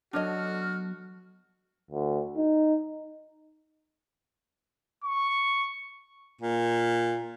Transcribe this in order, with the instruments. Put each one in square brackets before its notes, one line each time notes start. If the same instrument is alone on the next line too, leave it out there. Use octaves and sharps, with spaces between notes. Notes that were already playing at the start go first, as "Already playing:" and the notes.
[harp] F#3 B3 [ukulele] D4 C#5 D#5 [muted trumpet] F#4 [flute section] A4 F6
[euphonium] D2
D#4
[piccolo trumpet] C#6
[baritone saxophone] A#2